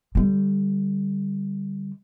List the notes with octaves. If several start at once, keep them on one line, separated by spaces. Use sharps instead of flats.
D3 G3